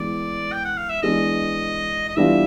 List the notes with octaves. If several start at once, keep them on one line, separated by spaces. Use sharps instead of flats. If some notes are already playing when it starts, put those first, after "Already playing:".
Already playing: E3 G#3 B3 D5
G5
F#5
F5
E5
E3 G#3 B3 D4 D#5
D#5
E3 G3 B3 D4 F4 E5